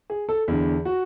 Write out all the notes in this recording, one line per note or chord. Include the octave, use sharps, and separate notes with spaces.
G#4
A4
E2 D3
F#4